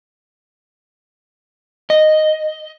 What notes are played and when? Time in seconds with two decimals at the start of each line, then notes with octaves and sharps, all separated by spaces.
1.90 D#5